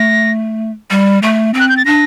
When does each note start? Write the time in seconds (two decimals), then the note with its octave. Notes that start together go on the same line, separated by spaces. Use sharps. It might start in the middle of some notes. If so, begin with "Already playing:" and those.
Already playing: A3 A#6
0.90 G3
1.23 A3
1.54 C4
1.60 F#6
1.69 G6
1.77 A6
1.85 D4 A#6